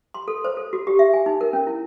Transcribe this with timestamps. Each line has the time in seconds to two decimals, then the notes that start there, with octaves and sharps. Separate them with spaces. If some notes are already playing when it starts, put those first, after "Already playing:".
0.14 C6
0.28 A4
0.45 C5
0.57 A4
0.73 F#4
0.87 G4
0.99 E5
1.14 G#5
1.26 D#4
1.41 A#4
1.53 C#4
1.67 E4